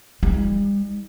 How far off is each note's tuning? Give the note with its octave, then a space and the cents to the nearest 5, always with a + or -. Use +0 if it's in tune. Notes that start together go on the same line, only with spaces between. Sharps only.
G3 +40 D#4 +45